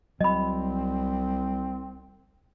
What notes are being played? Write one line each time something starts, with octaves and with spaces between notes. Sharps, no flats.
C2 F#3 C4 D#5 B5